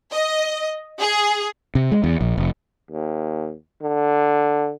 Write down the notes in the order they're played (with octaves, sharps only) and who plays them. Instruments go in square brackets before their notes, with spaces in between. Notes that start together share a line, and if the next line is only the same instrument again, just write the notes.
[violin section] D#5
G#4
[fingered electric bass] C3
G#3
E2
A#1
F1
[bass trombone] D#2
D3